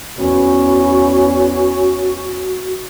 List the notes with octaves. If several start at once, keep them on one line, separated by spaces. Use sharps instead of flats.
E2 C#4 F#4